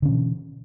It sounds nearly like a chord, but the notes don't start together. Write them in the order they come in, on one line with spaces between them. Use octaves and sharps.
D3 C#4 B2 E3